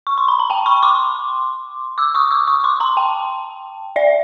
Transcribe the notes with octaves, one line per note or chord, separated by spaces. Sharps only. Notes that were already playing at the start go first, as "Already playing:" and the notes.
C#6
C6
B5
A#5
G5 A5
B5 C#6
C6 D6
D6 E6
C#6 D#6
D6 E6
C#6 D#6
C6 D6
A#5 C6
G5 A5
D5 E5